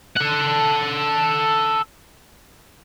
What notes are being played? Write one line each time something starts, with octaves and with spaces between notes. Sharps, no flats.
A4 F#5